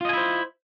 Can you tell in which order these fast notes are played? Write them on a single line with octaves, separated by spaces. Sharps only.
F4 D#5 G#5 E4 C5